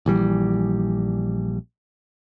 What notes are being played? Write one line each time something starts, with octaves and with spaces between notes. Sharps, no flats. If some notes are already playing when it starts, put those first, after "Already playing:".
A#1 E3 G3